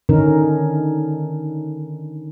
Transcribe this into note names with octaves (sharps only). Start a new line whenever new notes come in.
D3 D#3 C#4 D#4 A#4